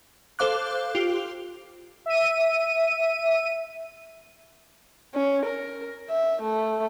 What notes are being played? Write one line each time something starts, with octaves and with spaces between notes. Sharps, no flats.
A4 C5 F5 D6 F#6
F4 G4
E5 D#7
C#4
A#4
E5
A3